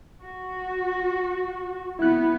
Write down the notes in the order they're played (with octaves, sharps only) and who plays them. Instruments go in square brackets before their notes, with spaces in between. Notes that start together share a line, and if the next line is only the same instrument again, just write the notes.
[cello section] F#4
[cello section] B3 [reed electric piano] E4 F#6